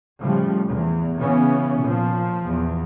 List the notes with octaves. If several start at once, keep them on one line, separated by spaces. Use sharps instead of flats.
A2 C#3 F3 G3
E2
C#3 E3 B3 C#4
A#2 F3
E2